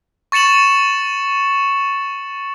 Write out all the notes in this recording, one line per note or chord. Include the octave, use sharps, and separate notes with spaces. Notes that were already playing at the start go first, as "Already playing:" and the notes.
C#6 A6 C#7 E7 F#7